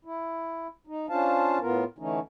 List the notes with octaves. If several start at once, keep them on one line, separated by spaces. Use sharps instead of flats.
E4
D#4
C#4 D4 F4 C5 F5 A5
A2 B3 F4 A#4
D3 E3 A3 C#4 D#4